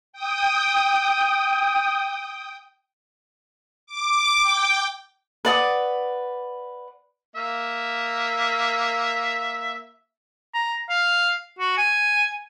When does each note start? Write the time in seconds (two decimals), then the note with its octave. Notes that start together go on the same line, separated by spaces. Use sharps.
0.13 G5 D#6
3.87 D6
4.43 G5
5.45 B4 D5 F#5 D#6
7.36 A#3 E5
10.54 A#5
10.89 F5
11.58 F#4
11.77 G#5